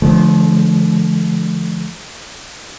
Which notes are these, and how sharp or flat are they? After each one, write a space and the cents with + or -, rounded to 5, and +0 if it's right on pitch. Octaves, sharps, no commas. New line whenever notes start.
D3 +0 F3 -30 A3 -45